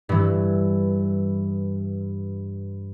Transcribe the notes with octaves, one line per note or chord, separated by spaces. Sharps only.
G2 E3